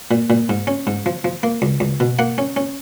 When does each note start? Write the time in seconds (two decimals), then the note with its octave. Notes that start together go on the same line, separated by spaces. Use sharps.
0.11 A#2
0.30 A#2
0.49 G#2
0.67 C#4
0.87 G#2
1.06 F3
1.24 F3
1.43 A#3
1.62 C#2
1.80 C#2
2.00 B2
2.19 A#3 F#5
2.38 C#4
2.57 C#4